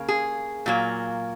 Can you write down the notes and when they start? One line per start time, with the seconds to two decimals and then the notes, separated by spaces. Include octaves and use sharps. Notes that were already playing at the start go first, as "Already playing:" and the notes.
Already playing: C#3 A#3
0.08 G#4
0.66 A#2 F#3 A#3